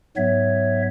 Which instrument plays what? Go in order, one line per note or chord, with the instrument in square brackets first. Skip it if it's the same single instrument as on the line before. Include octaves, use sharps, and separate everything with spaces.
[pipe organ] G#2 F#3 B3 C#5 E5